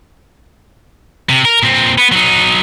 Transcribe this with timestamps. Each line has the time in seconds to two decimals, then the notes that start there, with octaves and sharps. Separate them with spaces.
1.29 C3
1.45 A#4
1.63 A#2 C4
1.98 B3
2.12 F#3 D#4